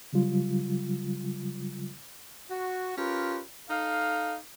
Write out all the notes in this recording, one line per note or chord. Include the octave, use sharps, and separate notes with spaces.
C#3 F#3 G3 F4
F#4
C#4 F4 G4 A#4 B4
D#4 A4 F5